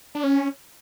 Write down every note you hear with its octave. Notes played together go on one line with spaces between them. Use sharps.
D4
C#4